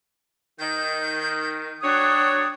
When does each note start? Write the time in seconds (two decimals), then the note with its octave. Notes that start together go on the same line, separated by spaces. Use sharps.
0.60 D#3 G6
1.82 F#3 D4 F#4 C#5 G5 D#6